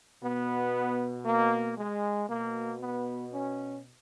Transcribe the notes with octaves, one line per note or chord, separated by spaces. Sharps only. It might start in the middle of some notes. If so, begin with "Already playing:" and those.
B2 B3
A#3
G#3
B2 A#3
B3
C#4